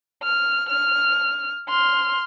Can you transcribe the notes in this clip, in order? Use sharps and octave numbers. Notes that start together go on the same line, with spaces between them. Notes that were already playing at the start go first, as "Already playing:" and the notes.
F6
F6
C6 F6